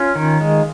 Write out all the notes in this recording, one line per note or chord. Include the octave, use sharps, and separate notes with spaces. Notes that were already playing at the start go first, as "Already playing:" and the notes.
Already playing: C#4 F4
D#3
G#3